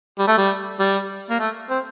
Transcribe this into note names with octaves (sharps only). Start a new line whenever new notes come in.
G3
A3
G3
G3
A#3
A3
C4